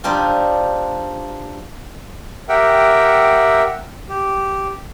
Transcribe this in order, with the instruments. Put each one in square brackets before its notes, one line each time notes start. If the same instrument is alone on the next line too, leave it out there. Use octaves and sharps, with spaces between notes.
[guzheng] F3 G3 D4 D#4 F4 G4
[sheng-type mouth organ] G4 A#4 E5 F#5 G5
G4